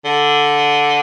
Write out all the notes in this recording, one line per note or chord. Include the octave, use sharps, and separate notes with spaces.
D3